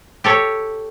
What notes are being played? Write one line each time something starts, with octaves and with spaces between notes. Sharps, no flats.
G4 A4 C#5